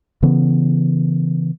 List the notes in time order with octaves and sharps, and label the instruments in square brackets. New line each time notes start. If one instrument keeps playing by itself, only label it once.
[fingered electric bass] C#3 E3 B3